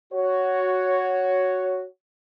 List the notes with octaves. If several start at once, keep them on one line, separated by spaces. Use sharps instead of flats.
F#4 C#5